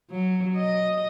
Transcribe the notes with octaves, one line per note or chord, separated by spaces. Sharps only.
F#3
D#5